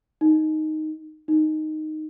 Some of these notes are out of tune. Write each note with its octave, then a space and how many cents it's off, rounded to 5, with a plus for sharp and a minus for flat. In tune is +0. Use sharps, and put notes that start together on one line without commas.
D#4 +0
D#4 -5